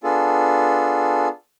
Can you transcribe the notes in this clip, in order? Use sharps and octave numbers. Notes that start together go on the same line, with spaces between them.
B3 D4 F4 G#4 A4